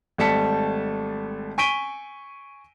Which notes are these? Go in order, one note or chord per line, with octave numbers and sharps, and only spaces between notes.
G#1 G3 A3 A5 B6 C#7
G#5 C#6 B6 D7 D#7 G7